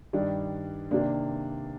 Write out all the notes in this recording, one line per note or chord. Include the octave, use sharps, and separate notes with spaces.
G2 D#3 G3 D4
C3 D#3 A#3 D4